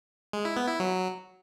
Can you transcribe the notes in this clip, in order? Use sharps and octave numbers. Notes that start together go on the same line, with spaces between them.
G#3
E4
B3
E4
F#3